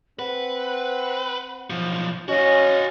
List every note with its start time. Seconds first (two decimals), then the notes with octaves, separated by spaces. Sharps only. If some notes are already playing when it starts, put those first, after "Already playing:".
0.19 C4 B4 F#5
1.70 B1 F3
2.28 C#4 F#4 D#5 F5